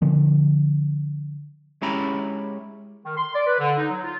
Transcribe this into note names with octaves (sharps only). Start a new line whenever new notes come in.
D3 F3
G#3 C#4 E4 G4 A#5 B5
D#3
C6
D5
B4
D3
D#4
F#3
F4